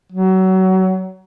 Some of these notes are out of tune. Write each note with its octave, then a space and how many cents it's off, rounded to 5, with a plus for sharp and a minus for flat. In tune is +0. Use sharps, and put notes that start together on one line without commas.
F#3 +25